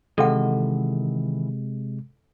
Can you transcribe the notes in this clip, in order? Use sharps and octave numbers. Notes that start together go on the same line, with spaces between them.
C3 D#3 E3 G#3 A4 D#5 F#5